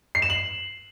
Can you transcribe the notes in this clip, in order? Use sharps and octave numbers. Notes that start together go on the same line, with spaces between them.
C7
E7
F#7